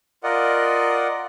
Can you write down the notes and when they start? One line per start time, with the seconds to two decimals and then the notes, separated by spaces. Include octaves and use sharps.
0.24 F4 A#4 D5 D#5 F#5